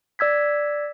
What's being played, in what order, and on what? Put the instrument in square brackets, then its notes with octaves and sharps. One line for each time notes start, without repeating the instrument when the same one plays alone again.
[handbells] D5 E6 G#6 B6